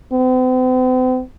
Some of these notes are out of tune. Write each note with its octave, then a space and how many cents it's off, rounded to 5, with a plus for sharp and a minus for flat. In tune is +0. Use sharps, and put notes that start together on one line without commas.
C4 -45